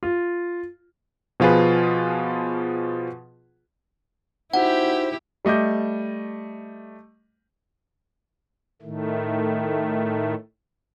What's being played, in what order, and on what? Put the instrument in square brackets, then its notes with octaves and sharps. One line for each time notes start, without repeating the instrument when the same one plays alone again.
[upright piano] F4
[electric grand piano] B2 F3 F4 G#4 B4
[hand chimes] D#4 F#4 [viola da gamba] E4 G4 [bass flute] C5 [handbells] F#5
[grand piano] G3 A3 D#5 D6 G6
[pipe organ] A2 D#3 A3